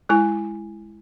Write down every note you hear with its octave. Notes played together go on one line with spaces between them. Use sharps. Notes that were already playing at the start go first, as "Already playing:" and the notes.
G#3 E4 G#5